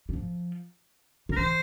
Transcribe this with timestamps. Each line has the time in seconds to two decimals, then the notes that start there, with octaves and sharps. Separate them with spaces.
0.09 G3
0.13 F3
1.29 C#3
1.32 A#4
1.37 E3 C5